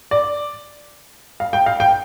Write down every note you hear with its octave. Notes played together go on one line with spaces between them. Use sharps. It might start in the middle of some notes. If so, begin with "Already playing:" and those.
D5
F5
G5
F5
G5